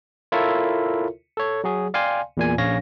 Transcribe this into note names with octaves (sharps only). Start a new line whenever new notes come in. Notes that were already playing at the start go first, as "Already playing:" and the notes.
E4 F4 A4 A#4 C#5 E5
A4 C#5
F#3 F#4 G#4
D5 F5 G5 G#5 C6
E2 A#2 G#5
A#1 C#4 C#5 F5 A#6